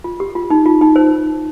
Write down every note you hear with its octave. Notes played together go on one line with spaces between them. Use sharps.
F4
G4
F4
D#4
F4
D#4
C5